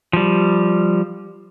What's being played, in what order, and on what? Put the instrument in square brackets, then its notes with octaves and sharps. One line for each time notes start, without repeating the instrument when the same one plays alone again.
[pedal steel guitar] F3 G3